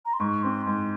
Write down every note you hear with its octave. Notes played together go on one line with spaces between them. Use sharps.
A#5
C6
G#2 C#6
C4 C6
G#2 C6